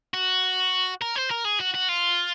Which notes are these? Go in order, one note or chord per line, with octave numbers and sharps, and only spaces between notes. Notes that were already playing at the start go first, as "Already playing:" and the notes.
F#4
A#4
C5
A#4
G#4
F#4
F#4
F4